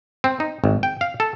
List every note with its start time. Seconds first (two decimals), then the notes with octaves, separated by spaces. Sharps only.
0.24 C4
0.40 D#4
0.64 G#1
0.83 G5
1.01 F5
1.20 A4